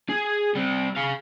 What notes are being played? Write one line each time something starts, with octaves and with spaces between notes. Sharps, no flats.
G#4
G3 C4
G#4 F5